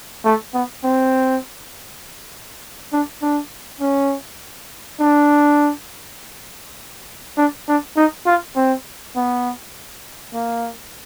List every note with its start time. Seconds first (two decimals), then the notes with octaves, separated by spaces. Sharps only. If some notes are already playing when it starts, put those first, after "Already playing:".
0.25 A3
0.54 B3
0.84 C4
2.92 D4
3.22 D4
3.81 C#4
5.01 D4
7.37 D4
7.68 D4
7.96 D#4
8.27 F4
8.56 C4
9.16 B3
10.34 A#3